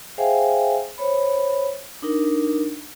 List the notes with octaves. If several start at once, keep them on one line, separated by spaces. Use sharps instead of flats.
G#4 C5 E5 F5 G5 G#5
C5 C#5 B5
D4 D#4 A#4